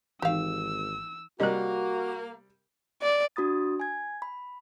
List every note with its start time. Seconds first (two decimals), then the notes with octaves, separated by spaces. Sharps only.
0.22 G#1 E3 D#4 G4 F5 E6
1.40 C3 G3 A#3 F#4 A#4 D5 D#5
3.02 D5
3.36 D4 F#4 B5 D#6 A6
3.80 G#5 G#6
4.22 B5